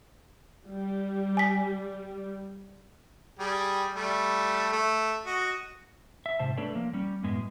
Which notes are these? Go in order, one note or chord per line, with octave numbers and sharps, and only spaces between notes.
G3
G#5 B6
G3 G4 G#4
G3 A3
A3
F#4 D#5
E5
G#2 C3 C5 A5
A3 D4 A4 B4 C#5 D5
F3 A#3
G3 C#4
F#2 A2 G#3 B3